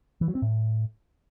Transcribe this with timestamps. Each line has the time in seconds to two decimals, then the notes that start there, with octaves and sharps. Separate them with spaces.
0.21 E3
0.28 F#3
0.35 C4
0.42 A2